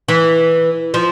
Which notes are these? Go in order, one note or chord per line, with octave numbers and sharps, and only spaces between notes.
E3
F3